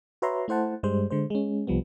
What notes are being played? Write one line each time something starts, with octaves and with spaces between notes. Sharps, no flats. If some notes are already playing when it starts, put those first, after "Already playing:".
F#4 B4 C#5 E5 A#5 C6
A3 E4 C5 F#5 A5
G2 G3 G#3 C5
D3 G#3 C5
G#3 C#4
C2 F3 G3 B3